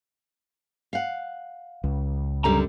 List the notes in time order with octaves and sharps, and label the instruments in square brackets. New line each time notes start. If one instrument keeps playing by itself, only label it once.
[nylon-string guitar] F5 F#5
[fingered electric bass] C#2
[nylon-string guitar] F#2 D3 G3 [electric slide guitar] C#4 A#5